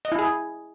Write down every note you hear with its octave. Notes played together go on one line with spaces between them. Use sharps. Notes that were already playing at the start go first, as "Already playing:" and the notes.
D#5
E4
G#4